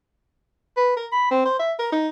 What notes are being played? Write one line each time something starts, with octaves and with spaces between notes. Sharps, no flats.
B4
A#4
B5
C4
C5
E5
A#4
D#4